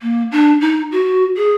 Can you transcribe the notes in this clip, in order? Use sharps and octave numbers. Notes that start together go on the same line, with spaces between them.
A#3
D4
D#4
F#4
G#4